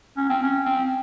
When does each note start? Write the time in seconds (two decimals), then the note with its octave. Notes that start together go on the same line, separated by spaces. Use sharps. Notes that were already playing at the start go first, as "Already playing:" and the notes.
0.17 C#4
0.29 C4
0.43 C#4
0.65 C4